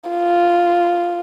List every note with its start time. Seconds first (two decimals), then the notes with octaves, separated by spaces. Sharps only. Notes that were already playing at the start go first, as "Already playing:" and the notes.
0.10 F4